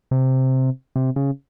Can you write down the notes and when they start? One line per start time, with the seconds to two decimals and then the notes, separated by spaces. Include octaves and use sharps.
0.11 C3
0.96 C3
1.16 C#3